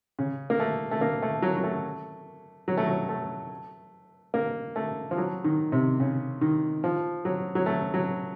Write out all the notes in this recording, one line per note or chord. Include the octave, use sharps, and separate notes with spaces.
C#3
A#3
A3
A3
A#3
A3
F#3
F#3
A3
F#3
A3
F#3
A3
A#3
A3
F3
F#3
D#3
C3
C#3
D#3
F3
F#3
F#3
A3
F#3